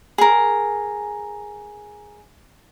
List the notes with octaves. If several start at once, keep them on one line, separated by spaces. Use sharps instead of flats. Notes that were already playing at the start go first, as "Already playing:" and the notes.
G#4 A#4